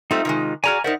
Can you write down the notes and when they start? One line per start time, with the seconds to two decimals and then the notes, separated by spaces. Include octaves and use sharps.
0.11 G3 A3 C4 D#4 F4
0.25 C3 D#3 G#3
0.64 F#4 G#4 D5 G#5 A#5 F6
0.84 D#4 A#4 C5 D5 E5 F#5